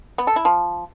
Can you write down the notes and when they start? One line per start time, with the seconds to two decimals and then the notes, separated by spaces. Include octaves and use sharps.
0.18 B3
0.27 A4
0.36 E4
0.45 F3